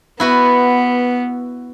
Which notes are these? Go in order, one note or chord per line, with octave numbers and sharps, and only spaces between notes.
B3 E4 F#4 B4